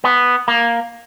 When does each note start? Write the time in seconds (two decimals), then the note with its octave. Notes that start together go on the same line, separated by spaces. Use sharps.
0.04 B3
0.48 A#3